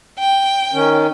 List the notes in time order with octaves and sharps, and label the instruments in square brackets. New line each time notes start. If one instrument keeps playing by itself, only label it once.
[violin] G5
[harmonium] D#3 C#4